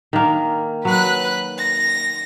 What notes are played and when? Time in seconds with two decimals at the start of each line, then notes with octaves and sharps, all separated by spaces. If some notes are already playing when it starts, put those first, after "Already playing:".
0.13 D#3 A#3
0.85 F#3 B4 F#6
1.57 A#6